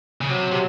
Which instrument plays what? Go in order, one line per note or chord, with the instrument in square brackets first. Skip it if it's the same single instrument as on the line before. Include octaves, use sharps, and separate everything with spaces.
[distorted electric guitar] C#3
[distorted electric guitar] C3 [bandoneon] F#3
[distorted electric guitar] C3